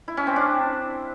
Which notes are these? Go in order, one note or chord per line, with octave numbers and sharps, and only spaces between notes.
E4
C#4
C4
D4